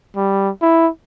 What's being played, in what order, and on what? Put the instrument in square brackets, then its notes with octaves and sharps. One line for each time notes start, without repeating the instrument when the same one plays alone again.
[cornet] G3
E4